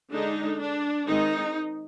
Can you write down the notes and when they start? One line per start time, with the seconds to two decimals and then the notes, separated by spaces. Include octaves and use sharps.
0.12 D3 G#3 D4 D#4
0.60 D4
1.06 D#3 G#3 C4 D#4